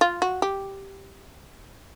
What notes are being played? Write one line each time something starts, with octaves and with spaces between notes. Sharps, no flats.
F4
F#4
G4